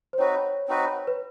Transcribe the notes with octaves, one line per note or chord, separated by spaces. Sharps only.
C5
C4 D#4 F#4 B4 C#5
C4 D#4 F#4 B4
B4